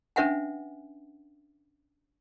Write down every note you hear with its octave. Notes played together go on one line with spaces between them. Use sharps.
C#4 D4 B4 E5 F#5 G#5